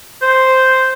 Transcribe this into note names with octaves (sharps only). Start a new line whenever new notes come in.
C5